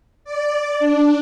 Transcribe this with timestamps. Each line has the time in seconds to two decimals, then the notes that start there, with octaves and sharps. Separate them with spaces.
0.24 D5
0.80 D4